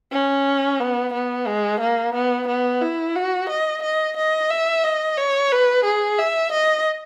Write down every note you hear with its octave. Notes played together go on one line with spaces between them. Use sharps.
C#4
B3
B3
G#3
A#3
B3
B3
E4
F#4
D#5
D#5
D#5
E5
D#5
C#5
B4
G#4
E5
D#5